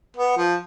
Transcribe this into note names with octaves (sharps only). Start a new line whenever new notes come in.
B3
F3